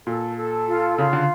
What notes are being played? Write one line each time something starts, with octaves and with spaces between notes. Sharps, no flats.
A#2 A4
A4
F4
C#3 F4
D3